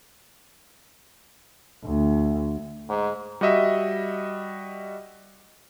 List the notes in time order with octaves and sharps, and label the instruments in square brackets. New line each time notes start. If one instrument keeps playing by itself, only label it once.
[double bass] D2
[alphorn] G#2
[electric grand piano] G3 F#4 D#5 E5